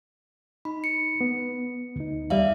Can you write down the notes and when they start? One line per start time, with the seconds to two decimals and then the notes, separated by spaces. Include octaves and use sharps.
0.65 D#4 B5
0.84 C#7
1.21 B3
1.96 D2 D#4
2.30 E2 G3 D5 E5 F5